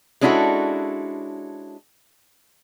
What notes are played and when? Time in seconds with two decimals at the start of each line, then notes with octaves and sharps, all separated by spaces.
0.21 G#3 C#4 D4 E4 F#4 A4